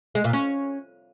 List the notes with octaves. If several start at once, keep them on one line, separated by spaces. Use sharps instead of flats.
G#3
A#2
C#4